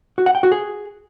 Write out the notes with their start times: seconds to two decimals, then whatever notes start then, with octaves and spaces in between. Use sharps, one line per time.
0.18 F#4
0.26 F#5
0.35 G5
0.43 F#4
0.52 G#4